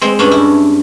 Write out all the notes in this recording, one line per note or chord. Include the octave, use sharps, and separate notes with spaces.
G#3 C4
G2 C#4 D4
E4